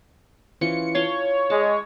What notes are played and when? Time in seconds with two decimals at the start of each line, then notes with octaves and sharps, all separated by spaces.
0.61 E3 C#4 F4 C#7
0.95 F4 C#5 A5 C6
1.50 G#3 A5